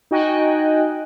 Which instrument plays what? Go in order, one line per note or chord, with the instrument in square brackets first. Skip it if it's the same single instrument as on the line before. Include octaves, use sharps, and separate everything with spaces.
[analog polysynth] D#4 F#4 D#5 G5 G#5 F#6